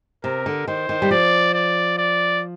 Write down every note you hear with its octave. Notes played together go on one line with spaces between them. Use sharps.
C3 A#4
D3
D#3 C5
D#3
G3
F3 D5
D5
D5